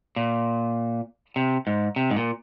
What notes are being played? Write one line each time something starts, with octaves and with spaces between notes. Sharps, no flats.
A#2
C3
G#2
C3
G#2
A#2